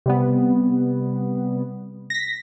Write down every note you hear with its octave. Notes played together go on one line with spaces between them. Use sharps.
C3 G3 B3
A#6 B6